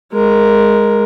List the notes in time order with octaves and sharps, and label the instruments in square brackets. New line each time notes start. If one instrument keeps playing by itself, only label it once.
[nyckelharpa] G#3 A#4